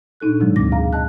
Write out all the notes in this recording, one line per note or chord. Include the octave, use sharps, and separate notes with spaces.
A#2 D4 D#4 A4 F#6
G#2 B2 D#3 E3 F#3 G#3
D2 D6 A#6
G#4 F5 A#5
D#5 A5 F#6